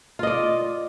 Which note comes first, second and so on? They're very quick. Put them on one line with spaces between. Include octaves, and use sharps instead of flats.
F4 D#5 D5